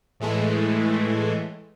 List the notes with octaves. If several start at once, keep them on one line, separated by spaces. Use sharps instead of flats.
A2 E3 G#3 A3